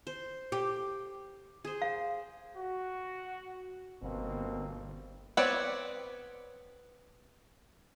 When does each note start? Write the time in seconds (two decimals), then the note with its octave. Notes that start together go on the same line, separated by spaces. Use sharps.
0.07 C5
0.52 G4
1.65 G#4 C5
1.82 F5
2.57 F#4
4.03 G1 B2 A#3 C4
5.37 B3 C4 B4 C#5 D5